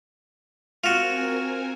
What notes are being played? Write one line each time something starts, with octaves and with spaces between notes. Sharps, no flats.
C4 F4 F#4 A#4 G#5